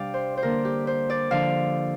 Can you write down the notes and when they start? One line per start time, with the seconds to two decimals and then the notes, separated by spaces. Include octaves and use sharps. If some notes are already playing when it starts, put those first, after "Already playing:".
Already playing: C3 G3 D4 D5 F5 G5
0.14 C5
0.37 C5
0.43 D3 A#3 D4 A#4
0.65 G4
0.87 C5
1.10 D5
1.31 D3 F3 D4 F5